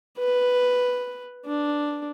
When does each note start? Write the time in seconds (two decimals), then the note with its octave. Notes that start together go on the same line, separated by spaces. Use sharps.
0.18 B4
1.46 D4